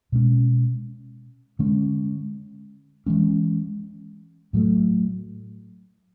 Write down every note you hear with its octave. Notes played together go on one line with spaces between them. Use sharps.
B2 G#3 C#4
D3 G#3 C#4
E3 G#3 C#4
A2 F#3 A3